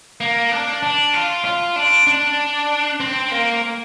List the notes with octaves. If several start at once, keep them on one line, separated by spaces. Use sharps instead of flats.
A#3
D4
D4
F4
F4
D4
D4
C4
A#3